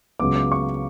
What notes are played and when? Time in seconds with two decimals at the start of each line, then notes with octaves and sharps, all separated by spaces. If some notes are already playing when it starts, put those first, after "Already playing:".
0.19 C#2 C#3 F#3 B3 D6
0.36 D6
0.52 C#6